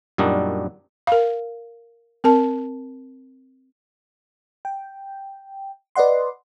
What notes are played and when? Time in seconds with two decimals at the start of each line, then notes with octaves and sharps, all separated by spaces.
0.18 F#2 A#2 G3 D4 D#4 F#4
1.07 A#4 F5
2.24 C4 A#4 A5
4.65 G5
5.96 B4 D5 D#5 F#5 C6